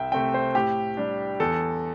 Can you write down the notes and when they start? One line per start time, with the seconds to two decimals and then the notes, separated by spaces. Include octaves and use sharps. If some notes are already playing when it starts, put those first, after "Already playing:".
Already playing: C2 E5 G5
0.12 C3 A3 C4 G5
0.34 C5
0.55 A2 G4
0.97 G3 D4
1.40 E2 A4